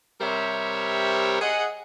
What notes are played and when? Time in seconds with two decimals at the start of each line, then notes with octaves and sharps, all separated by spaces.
0.21 C3 G3 A#4 C5 C#5 E5
1.41 G#4 D#5 F#5